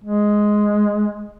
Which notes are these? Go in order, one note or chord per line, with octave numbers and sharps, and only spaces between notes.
G#3